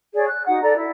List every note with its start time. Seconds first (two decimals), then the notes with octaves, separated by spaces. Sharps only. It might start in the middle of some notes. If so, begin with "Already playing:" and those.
0.15 G#4 C#5 D5
0.27 F#6
0.45 D#4 F#4 F#5
0.61 A4 D5 A#5
0.75 E4